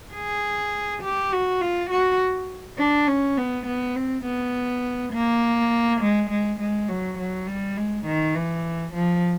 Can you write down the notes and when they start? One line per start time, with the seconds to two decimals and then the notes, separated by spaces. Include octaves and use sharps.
0.14 G#4
1.03 G4
1.32 F#4
1.61 F4
1.90 F#4
2.78 D4
3.08 C#4
3.37 B3
3.66 B3
3.96 C4
4.25 B3
5.13 A#3
6.01 G#3
6.30 G#3
6.60 G#3
6.89 F#3
7.18 F#3
7.47 G3
7.77 G#3
8.06 D#3
8.35 E3
8.94 F3